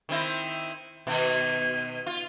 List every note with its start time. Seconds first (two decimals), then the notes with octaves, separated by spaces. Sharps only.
0.09 D#3 C4 E4
1.07 B2 D#3
2.06 F4